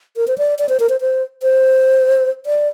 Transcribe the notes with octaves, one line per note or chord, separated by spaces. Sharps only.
A#4
C5
D5
D5
C5
A#4
C5
C5
C5
D5